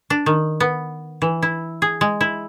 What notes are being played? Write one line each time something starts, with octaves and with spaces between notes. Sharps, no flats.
D4
D#3
B3
E3
E4
G#4
G#3
E4